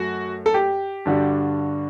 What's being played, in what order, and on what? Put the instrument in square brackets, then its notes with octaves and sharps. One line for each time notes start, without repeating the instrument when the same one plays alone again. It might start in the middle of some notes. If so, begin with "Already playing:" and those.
Already playing: [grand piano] F#2 A3 [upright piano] F#4
[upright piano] A4
G4
[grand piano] G2 D3 G3 D4 F#4